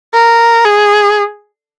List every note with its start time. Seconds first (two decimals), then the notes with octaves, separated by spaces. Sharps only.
0.14 A#4
0.65 G#4